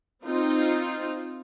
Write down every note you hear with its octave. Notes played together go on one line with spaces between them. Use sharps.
C4 D#4 F4